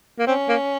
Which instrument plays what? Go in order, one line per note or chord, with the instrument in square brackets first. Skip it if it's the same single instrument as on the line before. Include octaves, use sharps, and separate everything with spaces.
[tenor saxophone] A#3
[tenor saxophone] C4 [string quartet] C#4
[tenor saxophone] A#3